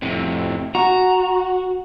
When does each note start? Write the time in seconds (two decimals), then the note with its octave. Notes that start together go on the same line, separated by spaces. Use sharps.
0.02 F2 A2 C3
0.75 F#4 A#5